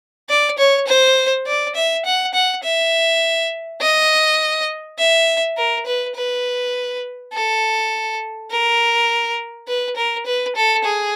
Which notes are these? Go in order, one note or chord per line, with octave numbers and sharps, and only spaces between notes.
D5
C#5
C5
D5
E5
F#5
F#5
E5
D#5
E5
A#4
B4
B4
A4
A#4
B4
A#4
B4
A4
G#4